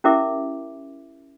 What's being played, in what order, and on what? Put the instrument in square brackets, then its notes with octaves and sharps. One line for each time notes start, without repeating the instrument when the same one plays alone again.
[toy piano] C#4 E4 G4 A#4 E5 D6